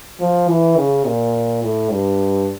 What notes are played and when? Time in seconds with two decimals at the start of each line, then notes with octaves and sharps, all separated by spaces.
0.20 F3
0.49 E3
0.77 C#3
1.05 A#2
1.62 A2
1.90 G2